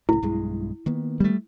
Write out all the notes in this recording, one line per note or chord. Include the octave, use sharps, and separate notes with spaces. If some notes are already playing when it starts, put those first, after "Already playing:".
C#2 A2 E4
B1 G2 G#3
D#3 A#3 B3
G3 A3